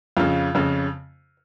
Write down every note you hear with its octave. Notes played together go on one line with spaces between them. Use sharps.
F2 C#3 F4
F2 C#3